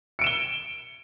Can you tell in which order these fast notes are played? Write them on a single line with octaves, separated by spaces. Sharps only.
C#7 D7 E7 G7